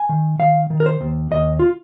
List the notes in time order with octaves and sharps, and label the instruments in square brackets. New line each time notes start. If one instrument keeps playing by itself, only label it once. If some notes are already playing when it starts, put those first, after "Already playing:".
Already playing: [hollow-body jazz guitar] G#5
D#3
D#3 F5
D#3
A#4
C5
D#2
D#2 D#5
F4